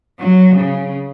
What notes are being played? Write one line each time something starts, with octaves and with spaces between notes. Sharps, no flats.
F#3
C#3